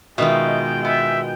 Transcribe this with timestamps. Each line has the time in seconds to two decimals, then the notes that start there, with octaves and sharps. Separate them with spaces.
0.18 B2 D#3 G#3 F4 E5 G5
0.85 B3 E5